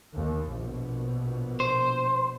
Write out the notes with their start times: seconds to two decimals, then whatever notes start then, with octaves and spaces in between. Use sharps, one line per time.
0.15 D#2
0.53 A#1 B2
1.60 C5